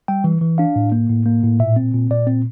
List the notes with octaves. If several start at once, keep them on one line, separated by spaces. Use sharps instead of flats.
G3 G5
E3
E3
D4 F5
A2
A#3
A2
A#3
A2
A#2 E5
C4
A#2
A#2 D5
C4